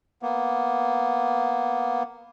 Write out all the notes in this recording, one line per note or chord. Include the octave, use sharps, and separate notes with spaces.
A#3 B3